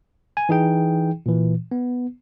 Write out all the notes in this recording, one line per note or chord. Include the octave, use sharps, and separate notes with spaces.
G#5
E3 D#4 G#4 G5
A#2 E3
B3